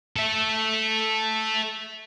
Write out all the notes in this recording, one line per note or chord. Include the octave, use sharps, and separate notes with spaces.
A4 E5